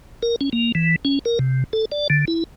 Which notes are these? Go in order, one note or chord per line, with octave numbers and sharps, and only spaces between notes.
A#4
C#4
A#3
E3
C#4
A#4
C3
A4
D5
D3
E4